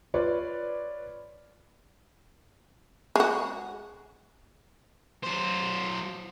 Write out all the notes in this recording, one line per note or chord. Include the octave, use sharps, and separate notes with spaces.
F4 B4 C#5 D5
G#3 F#4
F#3 C5